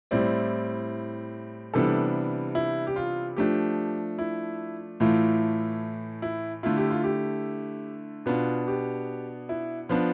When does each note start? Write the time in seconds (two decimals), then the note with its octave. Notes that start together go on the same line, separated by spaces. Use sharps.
0.11 A2 G3 C4 E4 D5
1.74 C3 E3 G3 B3 D4 A4
2.55 E4
2.87 G4
2.96 F4
3.36 F3 A3 D4 G4
4.18 E4
5.00 A2 E3 A3 E4 F4
6.22 E4
6.63 D3 A3 E4 F4
6.77 G4
6.90 F4
7.04 G4
8.26 B2 B3 D4 F4
8.68 G4
9.49 E4
9.89 F3 B3 D4 F4